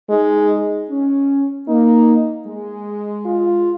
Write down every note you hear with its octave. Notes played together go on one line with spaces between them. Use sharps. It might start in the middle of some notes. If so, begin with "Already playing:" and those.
G#3 D#4
C#4
A#3 D#4
G#3
F4